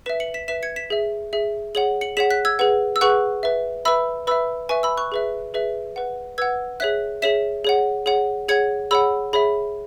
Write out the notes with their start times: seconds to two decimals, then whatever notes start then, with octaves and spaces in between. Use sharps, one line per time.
0.06 B4 E5 B6 E7
0.20 C#7 F#7
0.34 B6 E7
0.48 B4 E5 B6 E7
0.63 G#6 C#7
0.76 B6 E7
0.90 G#4 E5
1.33 G#4 E5
1.75 G#4 C#5 F#5 F#7
2.01 C#7 F#7
2.17 G#4 C#5 F#5 B6 E7
2.30 F#6 B6
2.45 E6 G#6
2.59 G#4 B4 F#5
2.96 E6
3.01 G#4 B4 F#5 C#6 F#6
3.43 B4 E5
3.85 B4 E5 B5 E6
4.27 B4 E5 B5 E6
4.69 B4 E5 G#5 C#6
4.83 B5 E6
4.97 C#6 F#6
5.12 G#4 B4 E5
5.54 G#4 B4 E5
5.96 B4 F#5
6.38 B4 F#5 E6 G#6
6.80 G#4 C#5 E5 F#6 B6
7.22 G#4 C#5 E5 B6 E7
7.64 G#4 C#5 F#5
8.06 G#4 C#5 F#5
8.48 G#4 C#5 F#5 G#6 C#7
8.91 G#4 C#5 F#5 B5 E6
9.33 G#4 C#5 E5 B5